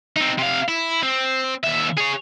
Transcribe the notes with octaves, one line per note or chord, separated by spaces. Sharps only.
C4 D#4
C3 F5
E4
C4
D#2 E5
G#4 C#5